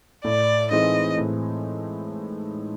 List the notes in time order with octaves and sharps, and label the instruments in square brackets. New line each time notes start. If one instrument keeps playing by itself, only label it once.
[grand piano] A2 [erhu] D5
[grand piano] E3 G#3 C4 D#4 [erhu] D#5
[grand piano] A2